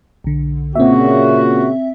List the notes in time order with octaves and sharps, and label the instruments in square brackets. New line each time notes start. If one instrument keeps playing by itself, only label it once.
[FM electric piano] B1 D3
[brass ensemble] A#2 C#3 F#4 [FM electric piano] C4 E5